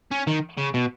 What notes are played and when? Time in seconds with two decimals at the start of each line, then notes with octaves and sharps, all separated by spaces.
0.11 C#4
0.27 D#3
0.58 C#3
0.74 B2